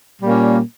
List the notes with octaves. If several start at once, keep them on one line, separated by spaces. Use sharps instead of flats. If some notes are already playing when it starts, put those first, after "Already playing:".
A#2 G3 A#3 C#4